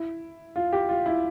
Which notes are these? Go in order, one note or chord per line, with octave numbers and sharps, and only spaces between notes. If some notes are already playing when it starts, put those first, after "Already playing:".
Already playing: E4
F4
G4
F4
E4